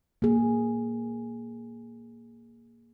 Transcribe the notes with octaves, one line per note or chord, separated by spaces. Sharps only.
A#3 G#4